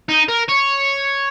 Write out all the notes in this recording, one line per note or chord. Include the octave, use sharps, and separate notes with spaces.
D#4
A#4
C#5